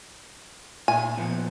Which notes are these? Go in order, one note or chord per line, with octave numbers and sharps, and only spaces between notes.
A#2 E5 G#5
A#2 F3 B3